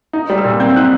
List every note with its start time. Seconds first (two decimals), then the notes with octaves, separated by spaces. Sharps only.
0.13 D#4
0.30 G3
0.38 E6
0.44 A#2
0.60 C4 G6
0.76 D#4 F#6